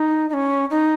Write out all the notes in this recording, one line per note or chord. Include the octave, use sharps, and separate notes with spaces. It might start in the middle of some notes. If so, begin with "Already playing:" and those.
Already playing: D#4
D#4
C#4
D#4